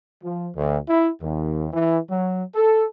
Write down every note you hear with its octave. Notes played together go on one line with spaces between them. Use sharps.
F3
D2
E4
D#2
E3
F#3
A4